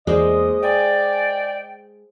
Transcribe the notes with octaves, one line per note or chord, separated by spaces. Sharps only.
E2 G#3 A#3 C5 D5 D#5
D5 D#5 G5 G#5